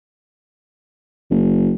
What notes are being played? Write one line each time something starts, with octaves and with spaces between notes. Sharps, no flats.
F#1